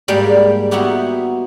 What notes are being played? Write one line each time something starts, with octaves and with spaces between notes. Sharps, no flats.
G#2 G3 G#3 A#3
B3 D#4 E4 F#4 G4